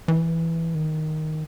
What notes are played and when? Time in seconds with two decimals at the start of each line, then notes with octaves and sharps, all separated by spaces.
0.08 E3
0.75 D#3